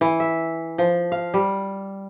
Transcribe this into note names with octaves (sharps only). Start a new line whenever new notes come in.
E3
E5
F3
F5
G3